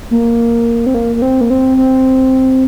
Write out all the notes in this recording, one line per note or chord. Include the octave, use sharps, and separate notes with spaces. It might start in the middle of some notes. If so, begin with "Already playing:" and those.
A#3
C4
A#3
A#3
C4
A#3
C4
C4